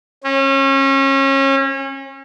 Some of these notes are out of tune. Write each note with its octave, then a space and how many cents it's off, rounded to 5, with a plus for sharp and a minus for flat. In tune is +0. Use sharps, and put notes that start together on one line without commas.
C#4 -30